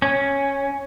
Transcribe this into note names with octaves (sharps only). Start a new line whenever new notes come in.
C#4